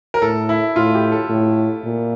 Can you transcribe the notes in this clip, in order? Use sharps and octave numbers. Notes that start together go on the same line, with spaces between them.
A#4
A2 A4
E4
A2 F4
G4
A4
A2
A#2